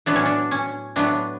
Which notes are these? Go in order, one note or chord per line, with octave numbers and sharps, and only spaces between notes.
A2 F#3 B3 D4
C#4
D4
C#4
A2 F#3 B3 D4